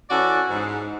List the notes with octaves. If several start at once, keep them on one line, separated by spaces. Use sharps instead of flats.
E3 C#4 F#4 A4 D5
G#2